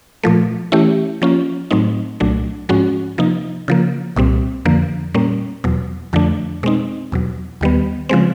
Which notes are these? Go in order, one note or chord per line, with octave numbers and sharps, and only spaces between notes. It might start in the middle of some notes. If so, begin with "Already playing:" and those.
A#2 F3 A3
E3 A3 C#4 E4 G4
F3 A#3 C#4 F4
A2 F#3 A3 C4 D#4
C2 A#2 F#3 A3 D4
G#2 F3 G#3 C#4 F#4
C3 F3 A#3 D#4
C#3 F3 A#3
C2 A#2 G3 C4
F2 D3 F3 A#3
A#2 G3 A#3 C#4
E2 B2 F#3
F2 D3 F3 A3 D4
B2 G#3 C4 D#4
E2 B2 F#3
D#2 D#3 G3 B3
C#3 F3 G#3 C4